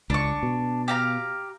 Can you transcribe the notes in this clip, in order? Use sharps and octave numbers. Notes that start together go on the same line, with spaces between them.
C#2 D4 C#6
B2
G4 F5 A#5